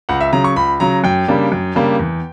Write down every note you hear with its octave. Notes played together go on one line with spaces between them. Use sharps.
C#2 F#5
E5
C#3 F#3 A#5
C#6
C#2 B5
C#3 F#3 A#5
F#2 G5
C#3 G3 A#3 D4
F#2
C#3 G3 A#3 D4
E2